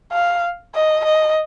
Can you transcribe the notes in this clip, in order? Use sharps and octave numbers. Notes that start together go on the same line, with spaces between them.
F5
D#5
D#5